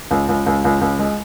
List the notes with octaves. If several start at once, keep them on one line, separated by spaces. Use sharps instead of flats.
C#2
C#2
C#2
C#2
C#2
G#3